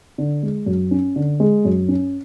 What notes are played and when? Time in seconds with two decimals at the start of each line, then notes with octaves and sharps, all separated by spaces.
0.18 D3
0.43 G#3
0.66 F#2
0.91 C#4
1.16 D3
1.40 G#3
1.65 F#2
1.88 C#4